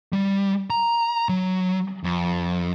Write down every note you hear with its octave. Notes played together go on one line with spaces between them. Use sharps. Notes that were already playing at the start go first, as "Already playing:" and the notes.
G3
A#5
F#3
F2